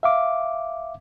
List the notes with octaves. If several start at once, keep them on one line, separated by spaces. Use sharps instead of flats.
E5 F5 D6